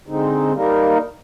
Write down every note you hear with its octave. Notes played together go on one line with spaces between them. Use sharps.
D3 G#3 C4 D#4
G3 A#3 D#4 A#4